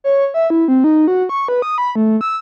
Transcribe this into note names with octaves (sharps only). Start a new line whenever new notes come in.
C#5
E5
E4
C4
D#4
F#4
C#6
B4
D#6
B5
A3
E6